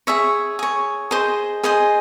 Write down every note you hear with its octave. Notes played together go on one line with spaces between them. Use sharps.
G#4 C#5 E5
G#4 C#5
G#4 C5 D#5
G#4 C5 D#5 G#5